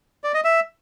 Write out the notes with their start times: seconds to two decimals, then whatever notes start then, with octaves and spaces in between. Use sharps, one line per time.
0.24 D5
0.34 D#5
0.44 E5